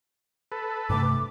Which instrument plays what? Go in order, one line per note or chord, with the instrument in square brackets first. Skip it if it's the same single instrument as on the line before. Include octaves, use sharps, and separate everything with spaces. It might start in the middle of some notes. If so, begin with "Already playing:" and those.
[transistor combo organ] A4 B4
[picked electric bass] G2 C3 A3 [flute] D6